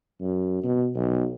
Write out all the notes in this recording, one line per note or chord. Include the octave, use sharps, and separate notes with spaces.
F#2
B2
B1